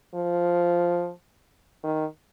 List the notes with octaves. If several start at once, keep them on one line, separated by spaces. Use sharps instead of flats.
F3
D#3